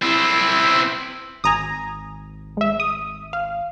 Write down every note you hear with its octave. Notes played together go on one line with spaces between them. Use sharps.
C4 E4
G#1 G#5 A#5 D#6
G#3 E5
D#6
F5